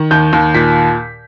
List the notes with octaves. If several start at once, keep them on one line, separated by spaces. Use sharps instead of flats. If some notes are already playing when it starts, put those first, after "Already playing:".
Already playing: D#3
D#2 G6
D#2
A#2 B6